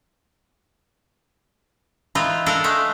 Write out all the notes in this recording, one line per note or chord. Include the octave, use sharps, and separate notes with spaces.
E3 D#4 F4
D4 A4 A#4 F5
G#3 A3